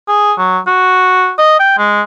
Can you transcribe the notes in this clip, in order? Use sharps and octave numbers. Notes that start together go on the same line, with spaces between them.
G#4
F#3
F#4
D#5
G5
G#3